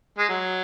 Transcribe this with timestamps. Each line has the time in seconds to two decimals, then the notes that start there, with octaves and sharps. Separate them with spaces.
0.18 G#3
0.29 F#3